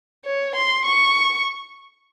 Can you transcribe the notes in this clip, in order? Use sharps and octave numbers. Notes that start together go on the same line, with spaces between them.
C#5
C6
C#6